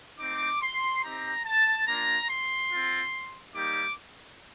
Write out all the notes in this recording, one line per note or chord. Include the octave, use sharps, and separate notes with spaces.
A3 C4 D#4 D6
C6
C4 D#4 G4 A#5
A5
A#3 D4 F4 A#5
C6
C4 F4
G3 A#3 D#4 G4 D6